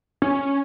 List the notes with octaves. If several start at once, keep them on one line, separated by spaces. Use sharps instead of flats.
C#4